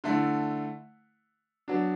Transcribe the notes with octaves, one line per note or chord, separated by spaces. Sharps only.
D3 A3 E4
F#3 B3 D4